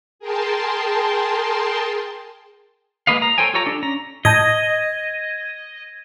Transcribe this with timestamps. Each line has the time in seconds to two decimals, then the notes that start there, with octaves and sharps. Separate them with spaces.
0.19 G#4 A#4 G5 A5 C6
3.07 G#3 A#3 B4 D#5 F5
3.22 A#5
3.38 A4 C5 C#5 G5 G#5
3.54 F4 G4 A4 C#5 A#5
3.66 D4 A4
3.83 C#4 A#5
4.25 A2 D#5 A5 G6 G#6 A#6 D#7